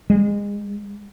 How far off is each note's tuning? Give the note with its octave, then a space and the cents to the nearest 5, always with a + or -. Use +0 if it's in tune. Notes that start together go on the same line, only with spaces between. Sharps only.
G#3 -30